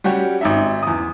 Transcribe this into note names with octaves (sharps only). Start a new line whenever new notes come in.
G3 C#4 F#4 G4
G#1 D#4 E5
E2 D#6